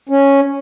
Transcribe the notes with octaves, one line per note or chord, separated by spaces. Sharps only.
C#4